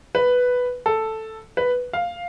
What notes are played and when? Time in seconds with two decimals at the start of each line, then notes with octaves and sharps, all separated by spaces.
0.15 B4
0.86 A4
1.57 B4
1.93 F5